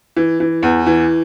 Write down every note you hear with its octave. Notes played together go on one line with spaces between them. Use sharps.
E3
E3
E2
E3